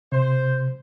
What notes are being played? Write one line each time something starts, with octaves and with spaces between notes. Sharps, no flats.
C3 C5